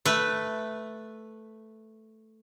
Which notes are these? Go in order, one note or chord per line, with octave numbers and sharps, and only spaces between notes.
A3 B4